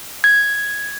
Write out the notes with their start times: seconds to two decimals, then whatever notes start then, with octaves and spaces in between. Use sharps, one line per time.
0.24 G#6